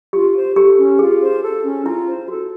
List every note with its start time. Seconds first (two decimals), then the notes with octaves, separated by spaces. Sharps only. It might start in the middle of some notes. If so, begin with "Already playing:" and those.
0.13 F4 G4
0.35 C5
0.56 G4 A4
0.78 C#4
0.99 F4 G#4
1.20 C5
1.42 A4
1.64 C#4
1.85 E4 F4
2.06 C5
2.28 F#4 A4